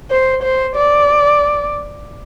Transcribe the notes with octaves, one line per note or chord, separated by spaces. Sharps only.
C5
C5
D5